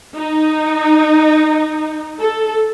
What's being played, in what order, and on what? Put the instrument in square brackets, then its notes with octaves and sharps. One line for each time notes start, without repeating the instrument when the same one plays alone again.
[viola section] D#4
A4